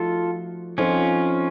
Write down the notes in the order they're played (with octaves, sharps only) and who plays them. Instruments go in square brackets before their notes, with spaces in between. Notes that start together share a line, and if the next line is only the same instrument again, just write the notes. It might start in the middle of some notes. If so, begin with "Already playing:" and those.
Already playing: [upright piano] F3 A3 D#4 F#4 [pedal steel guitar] F4 A4
[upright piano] F3 C4 D#4 A4 C5 [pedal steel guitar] C#4 F4